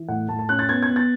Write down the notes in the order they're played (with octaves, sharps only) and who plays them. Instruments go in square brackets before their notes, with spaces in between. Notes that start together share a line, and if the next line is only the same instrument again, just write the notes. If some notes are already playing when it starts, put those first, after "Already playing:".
Already playing: [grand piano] E3
A2 F#5
A2 A5
A5
C#4 F#6
A6
B3 G#6
G#6
B3
A6